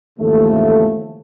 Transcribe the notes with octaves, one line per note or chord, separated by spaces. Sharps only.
D#2 G#2 C#3 E3 F3 A3